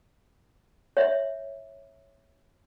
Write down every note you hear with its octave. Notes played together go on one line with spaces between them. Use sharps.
C#5 E5